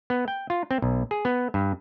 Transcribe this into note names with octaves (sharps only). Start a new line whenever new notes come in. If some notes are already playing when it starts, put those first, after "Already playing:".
B3
G5
F4
C4
B1
G#4
B3
G2